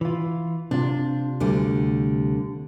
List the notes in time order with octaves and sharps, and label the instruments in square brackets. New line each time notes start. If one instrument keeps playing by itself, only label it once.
[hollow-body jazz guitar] E3 F4
[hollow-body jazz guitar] C3 F4 [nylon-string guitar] D4
[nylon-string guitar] D2 D3 G3